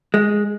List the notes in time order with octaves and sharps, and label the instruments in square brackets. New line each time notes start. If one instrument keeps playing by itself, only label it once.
[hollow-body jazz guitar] G#3